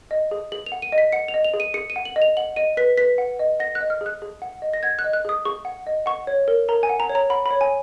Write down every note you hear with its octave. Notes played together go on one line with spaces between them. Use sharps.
D#5
G#4
G#4 F#7
F7
F#5
D#7
D#5
B6
F#5 C#7
F7
D#5
F7
G#4
D#7
G#4 C#7
D#7
F#5
F#7
D#5
F7
F#5 F#7
D#5 D#7
B4 B6
B4 B6
F#5
D#5
F#5 A#6
F#6
D#5
F6
G#4 F#6
G#4
F#5
D#5
A#6
F#5 G#6
F#6
D#5
F#6
G#4 D#6
G#4 C#6
F#5
D#5
F#5 C#6
C#5
A#4
A#4 A#5
G#5
F#5
A#5
C#5
A#5
F#5 B5
B5
C#5
G#5